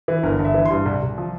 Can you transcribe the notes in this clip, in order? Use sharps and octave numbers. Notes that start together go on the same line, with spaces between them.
E3
G1 A#4
G1
E5
E3
C6
G2
C2
C2
F3